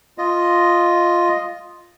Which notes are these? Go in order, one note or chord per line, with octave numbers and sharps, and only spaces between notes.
F4 D#5